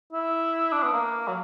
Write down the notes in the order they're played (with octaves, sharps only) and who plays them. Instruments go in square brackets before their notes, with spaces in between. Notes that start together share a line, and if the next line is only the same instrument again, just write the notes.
[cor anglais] E4
D4
B3
A#3
F#3